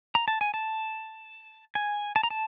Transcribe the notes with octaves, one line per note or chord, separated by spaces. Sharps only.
A#5
A5
G#5
A5
G#5
A5
A#5
A5